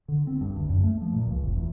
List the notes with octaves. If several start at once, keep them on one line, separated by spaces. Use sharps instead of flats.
D3
C4
G2
D2
F#2
A3
F3
A#2
C#2
F1
E2